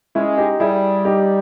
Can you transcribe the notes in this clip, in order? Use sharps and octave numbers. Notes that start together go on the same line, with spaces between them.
G#3 C#4 E4
D#4 G4
G3 E4 G#4
D#4 G4